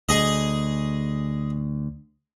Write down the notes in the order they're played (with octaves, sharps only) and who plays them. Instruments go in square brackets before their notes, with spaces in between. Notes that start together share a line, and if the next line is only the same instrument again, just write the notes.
[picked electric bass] D2 [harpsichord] G#4 D#5